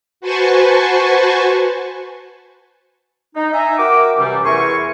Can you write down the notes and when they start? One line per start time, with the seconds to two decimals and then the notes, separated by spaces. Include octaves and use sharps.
0.21 F#4 B4 C5 G#5 A5 C#6
3.35 D#4
3.52 D#5 E5 G#5 A#5
3.78 F#4 A#4 E5 G5 D6
4.17 F#2 C3 E3 G3
4.45 E2 E4 A#4 G#5 C6 C#6